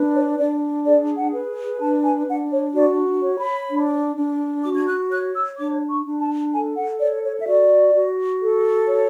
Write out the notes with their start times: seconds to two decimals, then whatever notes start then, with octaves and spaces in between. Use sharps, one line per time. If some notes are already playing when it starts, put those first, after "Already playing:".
Already playing: D4 B4
0.15 C#5
0.39 D4 D5
0.86 G#4 D5
1.18 F#5
1.33 B4
1.80 D4 A5
2.04 G#5
2.28 D4 F#5
2.52 C#5
2.74 F#4 D5
3.22 C#5
3.38 B5
3.69 D4
4.16 D4
4.64 F#4 D6
4.75 G#6
4.87 F#6
5.11 C#5 F#6
5.35 E6
5.58 D4 D6
5.90 C#6
6.05 D4
6.20 A5
6.52 A4 G#5
6.76 F#5
6.99 C#5 D5
7.24 C#5
7.39 E5
7.47 F#4 D5
7.94 F#4
8.41 A4
8.88 C#5